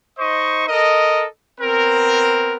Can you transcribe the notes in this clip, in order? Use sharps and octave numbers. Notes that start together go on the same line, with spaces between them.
D#4 C5 D#5 C#6
A4 A#4 D#5
B3 C4 A#4